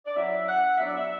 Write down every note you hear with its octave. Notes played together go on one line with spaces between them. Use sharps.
D5
F#3 C#4 E4 E5
F#5
F#3 B3 D4 E5
D5
E5